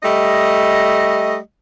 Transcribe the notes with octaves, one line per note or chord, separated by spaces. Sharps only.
G3 A3 D#5